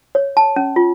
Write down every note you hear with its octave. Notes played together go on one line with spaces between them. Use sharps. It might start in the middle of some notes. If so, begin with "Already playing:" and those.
C#5
A5
C#4
F4